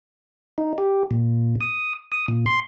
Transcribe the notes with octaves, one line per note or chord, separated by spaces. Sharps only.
D#4
G4
A#2
D#6
D#6
A#2
C6